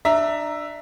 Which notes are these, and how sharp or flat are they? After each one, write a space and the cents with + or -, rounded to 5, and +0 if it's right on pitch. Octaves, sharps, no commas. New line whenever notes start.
D4 +25 E5 +0 A#5 +0